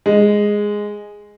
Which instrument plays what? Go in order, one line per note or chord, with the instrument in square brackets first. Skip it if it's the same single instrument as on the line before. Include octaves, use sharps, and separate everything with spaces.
[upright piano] G#3